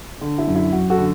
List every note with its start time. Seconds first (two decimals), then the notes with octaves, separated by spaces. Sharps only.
0.21 D3
0.38 E4
0.47 F#2
0.56 E4
0.72 F#2 F#4
0.90 F#4 A4
0.98 D3